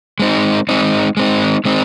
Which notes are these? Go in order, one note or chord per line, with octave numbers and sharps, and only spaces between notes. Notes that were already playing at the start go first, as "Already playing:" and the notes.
G#3 C4 D#4
G#3 C4 D#4
G#3 C4 D#4
G#3 C4 D#4